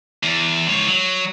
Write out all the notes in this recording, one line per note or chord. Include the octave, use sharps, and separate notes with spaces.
E2
G#2 C#5
F#3